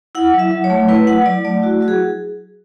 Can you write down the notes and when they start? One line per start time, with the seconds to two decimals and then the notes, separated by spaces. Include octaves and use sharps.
0.15 E4 F#5
0.34 F#3
0.39 E5
0.51 F#3
0.64 C#5
0.70 A3
0.88 E4 B4
1.07 F#3 F#5
1.26 F#3 D5
1.45 A3 D5
1.62 E4 F#4
1.81 F#3 F#4
1.88 G#4